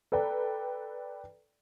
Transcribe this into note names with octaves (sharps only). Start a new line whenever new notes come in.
A4 B4 D5 G5 A#5